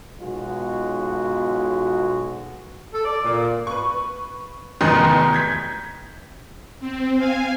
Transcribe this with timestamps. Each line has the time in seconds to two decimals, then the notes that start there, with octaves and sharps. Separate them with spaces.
0.19 B1 B2 G#3 F4 F#4
2.92 A4
3.04 D5
3.23 A#2
3.67 B4 C#6
4.81 F1 E2 D#3 A#5 C6 D#6
5.33 G6 G#6 B6
6.80 C4
7.17 F5 G#5